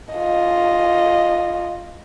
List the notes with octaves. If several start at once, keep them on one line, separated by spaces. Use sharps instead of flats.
F4 D#5